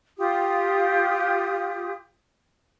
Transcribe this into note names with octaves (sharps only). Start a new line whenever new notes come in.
F4 G4 D#6